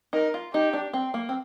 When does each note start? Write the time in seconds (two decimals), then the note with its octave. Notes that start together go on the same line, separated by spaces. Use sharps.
0.13 D#4 A#4
0.34 F4
0.54 D#4 G4
0.73 D4
0.93 C4
1.14 A#3
1.29 C4